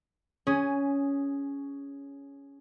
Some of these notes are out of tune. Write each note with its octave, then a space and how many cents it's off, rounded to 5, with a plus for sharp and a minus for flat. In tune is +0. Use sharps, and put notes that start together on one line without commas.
C#4 +10 G#4 +0